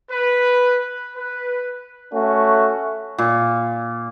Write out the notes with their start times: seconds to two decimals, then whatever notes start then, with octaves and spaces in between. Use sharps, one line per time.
0.10 B4
1.16 B4
2.13 A3 C#4 F#4
3.18 A#2